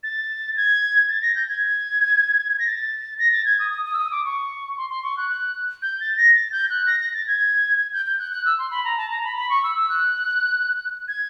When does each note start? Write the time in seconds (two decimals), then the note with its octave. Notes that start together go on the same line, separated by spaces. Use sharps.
0.03 A6
0.57 G#6
1.09 A6
1.22 A#6
1.35 G6
1.49 G#6
2.59 A#6
2.67 A6
3.19 A#6
3.32 A6
3.45 G#6
3.59 D#6
3.72 D#6
3.85 D#6
3.93 E6
3.98 D#6
4.11 D6
4.25 C#6
4.77 C6
4.90 C6
5.03 C#6
5.17 F#6
5.30 F#6
5.82 G6
6.00 A6
6.17 A#6
6.35 A6
6.52 G6
6.70 F#6
6.87 A#6
7.00 A#6
7.14 A6
7.27 G#6
7.93 G6
8.06 G6
8.19 F#6
8.32 F#6
8.45 E6
8.58 C6
8.71 B5
8.84 A#5
8.97 A5
9.10 A#5
9.24 B5
9.36 B5
9.49 C#6
9.63 E6
9.76 E6
9.89 F#6
11.08 G#6